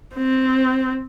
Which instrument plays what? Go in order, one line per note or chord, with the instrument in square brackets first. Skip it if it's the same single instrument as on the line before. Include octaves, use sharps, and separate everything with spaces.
[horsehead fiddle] C4